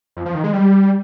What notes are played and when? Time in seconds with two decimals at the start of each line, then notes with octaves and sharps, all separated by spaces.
0.17 F2
0.26 F3
0.35 D#3
0.44 G#3
0.53 G3